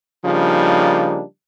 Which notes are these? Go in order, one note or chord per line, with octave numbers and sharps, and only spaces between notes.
C#3 F3 G3 A#3 D4 D#4